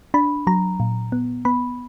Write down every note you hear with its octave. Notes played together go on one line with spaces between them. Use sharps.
D4 B5
F#3 A#5
A#2
B3
B3 B5